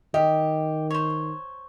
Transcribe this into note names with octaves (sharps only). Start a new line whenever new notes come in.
D#3 G4 D#5
C5 C#5